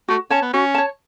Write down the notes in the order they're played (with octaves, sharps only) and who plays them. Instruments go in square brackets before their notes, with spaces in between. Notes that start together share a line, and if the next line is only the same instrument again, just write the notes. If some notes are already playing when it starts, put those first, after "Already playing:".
[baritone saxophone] A3 [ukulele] F#4
[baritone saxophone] C#4 [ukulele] C#5 A5
[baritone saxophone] B3
[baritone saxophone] C#4 [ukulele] F#4
[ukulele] C#5 A5